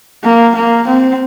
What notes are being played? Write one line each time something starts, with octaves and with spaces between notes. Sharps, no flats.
A#3
A#3
C4